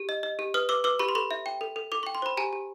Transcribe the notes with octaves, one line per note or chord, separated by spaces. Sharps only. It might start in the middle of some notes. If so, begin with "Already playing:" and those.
Already playing: G4
D#5
D#5
G4
B4 D#6 F6
B4 D6 E6
B4 D6 E6
G4 B5 C#6
C6
A4 B5 C#6
E5
G5
A4
A4
A4 D6
G5 C#6
C6
C5 B5
G4 G#5 A#5
G4